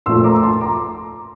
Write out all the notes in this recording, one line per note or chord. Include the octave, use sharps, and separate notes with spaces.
A#2 F3 A3 C6 E6
A#5 D6
A5 C6
A#5 D6